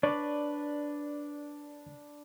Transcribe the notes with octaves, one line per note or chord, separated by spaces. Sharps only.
D4 B4 C#5 D5